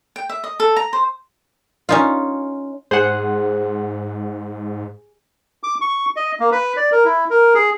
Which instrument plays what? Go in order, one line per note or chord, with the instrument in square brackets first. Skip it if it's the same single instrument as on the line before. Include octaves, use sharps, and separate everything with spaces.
[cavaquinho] G5
E5
D#5
A4
A#5
C5
[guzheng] C#4 D#4 F4
[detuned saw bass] G#2 [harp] G#4 [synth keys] C5 F#5
[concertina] D6
C#6
D#5
A#3
B4
D5
A#4
E4
A#4
G#4